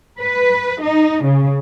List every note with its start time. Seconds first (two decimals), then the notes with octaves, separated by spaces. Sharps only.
0.19 B4
0.82 D#4
1.24 C#3